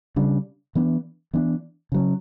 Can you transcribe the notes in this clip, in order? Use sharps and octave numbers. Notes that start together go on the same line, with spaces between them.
C#3 G3 D4
E3 B3 D4
E3 B3 D4
C#3 F#3 C#4